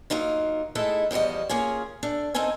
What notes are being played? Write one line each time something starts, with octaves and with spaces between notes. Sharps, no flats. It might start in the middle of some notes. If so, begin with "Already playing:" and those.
F#3 A#3 D#4 F4
G#3 A3 D#4 E4 A4
E2 F3 G3 F#4 D#5
A#3 C#4 F4 G#4
A3 D4
C4 D#4 A4 A#4 G#5